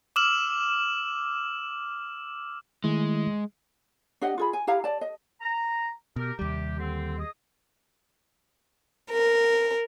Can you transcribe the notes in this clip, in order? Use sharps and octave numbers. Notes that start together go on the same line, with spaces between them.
D6 E6 F6 E7 F#7
D#3 G#3 A3 E4
D4 G4 D#5 F#5
F4 G#4 B5
G#5
E4 G4 F5 A#5
D5 A5
D#5
A#5
B2 G4 A#4
D#2 C3 G3 G4
D3 C4
G#4 D#5 D#6
A#4